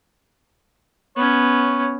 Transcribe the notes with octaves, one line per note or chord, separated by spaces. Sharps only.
B3 C#4 C#5